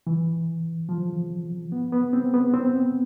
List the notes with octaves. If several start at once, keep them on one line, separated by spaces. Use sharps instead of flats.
E3
F3
B3
B3
C4
B3
C4